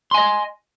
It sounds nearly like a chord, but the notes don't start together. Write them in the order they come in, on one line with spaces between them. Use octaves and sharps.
C6 G#5 D#5